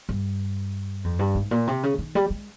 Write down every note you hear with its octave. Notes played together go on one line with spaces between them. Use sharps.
G2
F2
G2
G#2
A#2
C3
C#3
D#3
G3
G#3